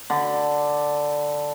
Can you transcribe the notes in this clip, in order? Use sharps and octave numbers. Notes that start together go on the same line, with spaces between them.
D3 B5